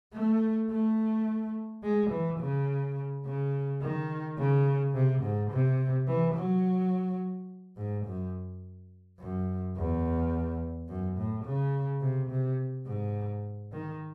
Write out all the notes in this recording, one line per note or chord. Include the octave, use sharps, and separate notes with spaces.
A3
A3
G#3
E3
C#3
C#3
D#3
C#3
C3
G#2
C3
E3
F#3
G#2
F#2
F#2
E2
F#2
A2
C#3
C3
C3
G#2
D#3